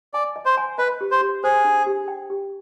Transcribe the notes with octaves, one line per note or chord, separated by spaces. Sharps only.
D5 G#5
D#5
C5
G#5
B4 D#5
G4
C5
G4
G#4 C5
D4
G4
G5
G4